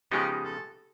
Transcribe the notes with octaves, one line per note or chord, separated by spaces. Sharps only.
C#3 F3 G#3 B3 D#4 G4
A4